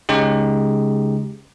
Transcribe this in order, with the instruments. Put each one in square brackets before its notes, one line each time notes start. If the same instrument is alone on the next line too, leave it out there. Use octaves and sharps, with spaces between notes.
[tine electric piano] C#3 G#3 D#4 G4